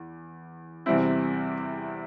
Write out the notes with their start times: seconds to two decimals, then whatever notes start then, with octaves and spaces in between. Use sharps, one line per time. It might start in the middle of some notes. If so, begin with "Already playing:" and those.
Already playing: E2
0.86 E2 C3 G3 C4 E4